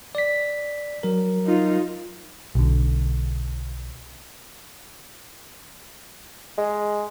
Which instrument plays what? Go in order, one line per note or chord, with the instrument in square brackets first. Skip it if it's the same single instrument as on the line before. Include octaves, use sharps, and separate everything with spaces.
[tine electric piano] D5 B6
F#3 A#4
[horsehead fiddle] D#4 F4
[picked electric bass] B1 D3
[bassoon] G#3